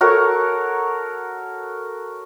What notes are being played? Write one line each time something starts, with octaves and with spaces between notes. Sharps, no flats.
F#4 A4 A#4 C#5